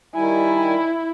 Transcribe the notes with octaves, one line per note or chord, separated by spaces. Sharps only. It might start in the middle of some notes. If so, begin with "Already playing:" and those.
D#3 G3 E4 G#5